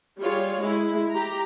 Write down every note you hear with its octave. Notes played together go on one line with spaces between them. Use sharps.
G3 F4 G#4 C#5
G#3 E4
G4 A#5